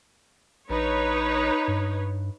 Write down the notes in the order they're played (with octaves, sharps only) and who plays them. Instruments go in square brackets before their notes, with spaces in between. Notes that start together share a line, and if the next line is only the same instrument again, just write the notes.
[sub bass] A#1 [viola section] D#4 B4 C#5
[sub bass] G2